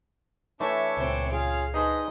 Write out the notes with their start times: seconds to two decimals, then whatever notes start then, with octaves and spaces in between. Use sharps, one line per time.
0.60 E3 A3 D4 E4 C#5 E5 D6
0.97 C#2 A#2 C4 C5
1.32 C#4 F4 G#4 F5
1.74 D4 D#4 G#4 B4 C5 D#5